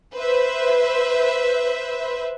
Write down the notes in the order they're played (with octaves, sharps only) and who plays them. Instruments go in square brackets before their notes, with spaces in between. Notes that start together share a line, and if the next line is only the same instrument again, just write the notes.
[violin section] B4 C5 E5